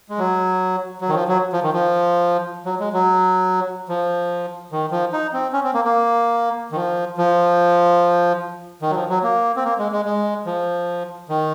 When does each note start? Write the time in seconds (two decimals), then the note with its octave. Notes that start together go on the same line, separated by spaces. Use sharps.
0.09 G#3
0.19 F#3
1.01 F#3
1.09 D#3
1.14 F3
1.28 F#3
1.53 F3
1.63 D#3
1.73 F3
2.65 F#3
2.80 G#3
2.93 F#3
3.89 F3
4.72 D#3
4.91 F3
5.13 D#4
5.33 C4
5.53 C#4
5.64 C4
5.74 A#3
5.85 A#3
6.72 D#3
6.76 F3
7.18 F3
8.82 D#3
8.90 F#3
8.95 F3
9.09 F#3
9.23 A#3
9.56 C4
9.64 A#3
9.78 G#3
9.92 G#3
10.05 G#3
10.46 F3
11.29 D#3